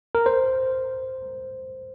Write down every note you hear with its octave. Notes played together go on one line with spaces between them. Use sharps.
A#4
C5